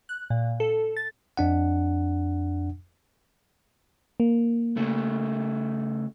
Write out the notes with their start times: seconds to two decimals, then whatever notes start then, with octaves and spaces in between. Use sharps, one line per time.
0.09 F#6
0.30 A#2
0.60 A4
0.97 A6
1.37 F2 D4 F#5
4.20 A#3
4.77 C#3 A3